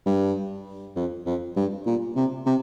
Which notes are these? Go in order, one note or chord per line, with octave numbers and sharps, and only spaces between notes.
G2
F2
F2
G2
A#2
C3
C3